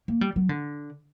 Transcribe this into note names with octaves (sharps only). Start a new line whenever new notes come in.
A#3
G3
F#3
D3